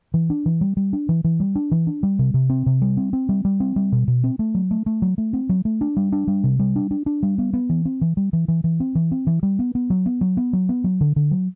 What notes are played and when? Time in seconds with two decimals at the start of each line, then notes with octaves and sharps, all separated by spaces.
0.14 E3
0.30 D4
0.46 E3
0.61 G3
0.77 G3
0.93 D4
1.09 E3
1.24 E3
1.40 G3
1.55 D4
1.71 E3
1.87 D4
2.03 G3
2.19 C3
2.34 C3
2.50 C4
2.66 C3
2.82 G3
2.97 C4
3.13 C4
3.29 G3
3.45 G3
3.60 C4
3.76 G3
3.92 B2
4.08 B2
4.24 C4
4.39 A3
4.55 F#3
4.71 A3
4.86 A3
5.02 F#3
5.18 A3
5.33 C4
5.49 F#3
5.65 A3
5.81 D4
5.97 G3
6.12 D4
6.27 G3
6.44 C3
6.59 G3
6.76 D4
6.91 D4
7.06 D4
7.23 G3
7.38 B3
7.53 B3
7.69 E3
7.85 C4
8.01 E3
8.17 G3
8.33 E3
8.48 E3
8.64 E3
8.80 C4
8.95 E3
9.11 C4
9.27 E3
9.43 G3
9.59 B3
9.75 B3
9.90 F#3
10.06 B3
10.21 F#3
10.37 B3
10.53 F#3
10.69 B3
10.84 F#3
11.01 D3
11.16 D3
11.31 F#3